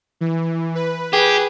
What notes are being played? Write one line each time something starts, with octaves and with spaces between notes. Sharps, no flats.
E3
B4
G4 G#4